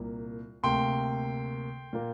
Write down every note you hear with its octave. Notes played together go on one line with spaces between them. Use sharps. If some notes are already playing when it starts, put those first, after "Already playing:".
Already playing: C2 A#2 A#3
D2 C3 A#3 G5 C6
A#2 A#3